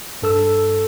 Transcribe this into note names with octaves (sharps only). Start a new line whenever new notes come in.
G2 A4 E6